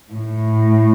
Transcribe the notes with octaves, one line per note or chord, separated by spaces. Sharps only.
A2